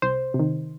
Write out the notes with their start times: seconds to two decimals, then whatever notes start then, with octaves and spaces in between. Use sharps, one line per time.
0.02 C2 C5
0.34 C3
0.39 D#3